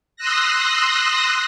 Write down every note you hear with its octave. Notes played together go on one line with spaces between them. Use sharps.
C6 D#6 E6 F#6 A#6